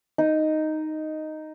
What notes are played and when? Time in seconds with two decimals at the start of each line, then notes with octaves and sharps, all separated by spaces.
0.18 D#4